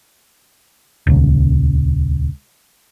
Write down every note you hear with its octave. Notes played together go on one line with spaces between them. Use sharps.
D#1 C#2